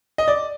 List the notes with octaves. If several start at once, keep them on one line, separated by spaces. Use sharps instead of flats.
D#5
D5